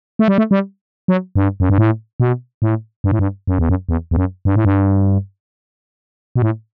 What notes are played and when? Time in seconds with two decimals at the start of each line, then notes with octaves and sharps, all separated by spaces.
0.19 A3
0.28 G3
0.38 A3
0.51 G3
1.08 F#3
1.36 G2
1.60 F#2
1.70 G2
1.78 A2
2.20 B2
2.62 A2
3.04 G2
3.12 A2
3.19 G2
3.47 F#2
3.59 E2
3.69 F#2
3.89 E2
4.11 E2
4.17 F#2
4.45 G2
4.56 A2
4.65 G2
6.36 B2
6.42 A2